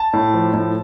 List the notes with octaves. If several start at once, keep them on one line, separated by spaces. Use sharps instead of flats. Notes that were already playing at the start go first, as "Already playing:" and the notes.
Already playing: A5
A2
F3
A2